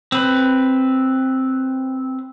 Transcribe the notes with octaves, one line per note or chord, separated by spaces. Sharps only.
C4 B4